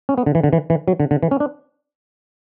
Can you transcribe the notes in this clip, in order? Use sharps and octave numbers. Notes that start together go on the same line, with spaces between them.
C#4
B3
D3
E3
D3
E3
E3
F#3
D3
D3
E3
C#4
D4